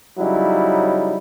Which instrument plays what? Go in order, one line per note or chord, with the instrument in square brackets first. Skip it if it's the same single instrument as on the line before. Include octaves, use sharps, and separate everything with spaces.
[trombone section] C#3 F#3 G3 D#4 E4